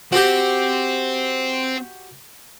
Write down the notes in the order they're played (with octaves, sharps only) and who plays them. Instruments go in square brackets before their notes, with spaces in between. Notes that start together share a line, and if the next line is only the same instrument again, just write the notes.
[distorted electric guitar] C4 [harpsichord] F#4 G4